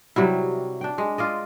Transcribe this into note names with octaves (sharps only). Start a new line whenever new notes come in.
C3 F#3 G3 E4
D4 G5
G#3
F4 D5 D#5